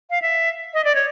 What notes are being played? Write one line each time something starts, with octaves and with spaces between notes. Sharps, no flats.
F5
E5
D#5
D5
C#5